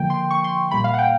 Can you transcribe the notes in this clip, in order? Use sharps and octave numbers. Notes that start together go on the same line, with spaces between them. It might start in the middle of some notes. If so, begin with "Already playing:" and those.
Already playing: D3 F3 A#3 G5
C6
C#6
C6
A#2 G3 A#3 B5
F5
F#5
G5